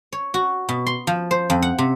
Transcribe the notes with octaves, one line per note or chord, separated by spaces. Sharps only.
C#5
F#4
B2
C6
F3
C5
F2
F#5
C3